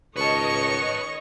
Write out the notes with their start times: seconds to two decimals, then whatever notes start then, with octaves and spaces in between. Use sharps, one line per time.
0.16 C#2 D#3 B4 C#5 D#5 A5 C#6